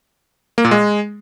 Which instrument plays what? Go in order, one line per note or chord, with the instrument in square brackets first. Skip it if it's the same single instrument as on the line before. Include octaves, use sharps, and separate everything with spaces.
[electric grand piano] A#3
A#2
G#3